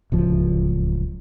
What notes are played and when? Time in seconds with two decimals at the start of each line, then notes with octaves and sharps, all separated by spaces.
0.12 D1 C#2 F3